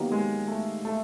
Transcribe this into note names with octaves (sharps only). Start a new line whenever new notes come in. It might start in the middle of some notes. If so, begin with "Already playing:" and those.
Already playing: D#3 F#3 A#3 B3 D#4 G4
G#3
A3
A3